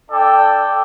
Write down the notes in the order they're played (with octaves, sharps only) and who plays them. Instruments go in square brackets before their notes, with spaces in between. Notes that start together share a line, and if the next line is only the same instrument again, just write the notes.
[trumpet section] D4 A4 D5 G5